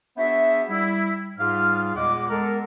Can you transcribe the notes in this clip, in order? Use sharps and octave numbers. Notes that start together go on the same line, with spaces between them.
B3 D4 F#4 G#4 C5 E5
G3 E4
G#2 G3 F4 G#4 F5 F6
E2 A#2 G#3 D#5 F#5 D6
G#3 B3 A4 A#4